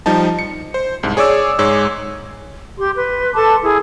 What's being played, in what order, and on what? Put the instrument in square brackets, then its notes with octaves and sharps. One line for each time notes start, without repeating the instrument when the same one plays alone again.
[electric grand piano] F3 G3 D#4 A5
C#7
C5
C2 G#2
G#4 C#5 D5 D6 E6
G#2 G#3 C#5 E6
[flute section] G4 C6
B4 C6
A4 A5 C6 D6
E4 G#4